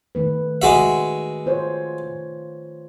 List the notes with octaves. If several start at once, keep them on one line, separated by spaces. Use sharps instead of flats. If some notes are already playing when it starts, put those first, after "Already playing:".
D#3 A3 B4
G#3 F#4 E5
F4 C5 C#5